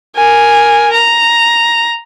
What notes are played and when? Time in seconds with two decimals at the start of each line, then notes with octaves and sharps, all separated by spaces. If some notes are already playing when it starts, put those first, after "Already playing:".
0.16 A#4 G#5
0.94 A#5